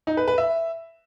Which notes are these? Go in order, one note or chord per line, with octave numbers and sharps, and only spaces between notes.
D#4
B4
B4
E5